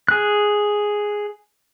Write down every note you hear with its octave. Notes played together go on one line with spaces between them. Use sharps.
G#4 F#6